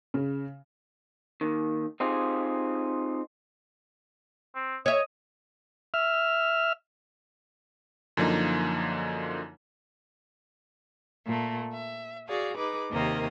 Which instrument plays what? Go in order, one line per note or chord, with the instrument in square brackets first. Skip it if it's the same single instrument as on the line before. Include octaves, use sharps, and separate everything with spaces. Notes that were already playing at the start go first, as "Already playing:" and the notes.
[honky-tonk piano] C#3
[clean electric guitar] D#2 D#3
C4 D#4 F4 G4 G#4
[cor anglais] C4
[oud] C#5 E5 [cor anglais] D#5
[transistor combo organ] E5 F6
[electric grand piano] F#2 D3 F3 A#3 D#4
[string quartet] A#2 A3
E5
F#4 G#4 D5 F5
D#4 G#4 B4 D6
D#2 C3 D#3 A#3 D#5